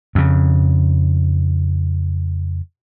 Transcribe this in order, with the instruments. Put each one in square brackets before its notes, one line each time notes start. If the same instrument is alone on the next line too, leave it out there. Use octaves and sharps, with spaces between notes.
[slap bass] F2 C#3